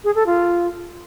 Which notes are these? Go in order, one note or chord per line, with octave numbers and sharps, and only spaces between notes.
G#4
A4
F4